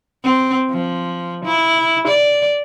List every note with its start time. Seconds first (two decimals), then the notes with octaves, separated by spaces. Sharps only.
0.24 C4
0.70 F3
1.45 E4
2.07 D5